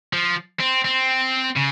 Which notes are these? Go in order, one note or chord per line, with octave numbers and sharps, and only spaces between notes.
F3
C4
C4
C#3